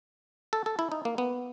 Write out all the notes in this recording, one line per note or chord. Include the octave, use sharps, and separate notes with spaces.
A4
A4
E4
D#4
A#3
B3